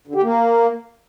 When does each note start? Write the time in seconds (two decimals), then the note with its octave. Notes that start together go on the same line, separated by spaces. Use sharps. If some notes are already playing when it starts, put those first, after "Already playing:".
0.07 D3
0.15 G4
0.23 A#3